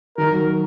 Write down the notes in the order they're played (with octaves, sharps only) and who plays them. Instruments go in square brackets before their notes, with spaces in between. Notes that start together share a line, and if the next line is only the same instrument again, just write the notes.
[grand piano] D#3 [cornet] A#4
[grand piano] F#3